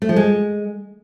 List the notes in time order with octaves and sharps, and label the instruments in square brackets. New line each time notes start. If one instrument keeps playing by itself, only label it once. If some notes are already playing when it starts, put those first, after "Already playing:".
[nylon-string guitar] A3
F3
G#3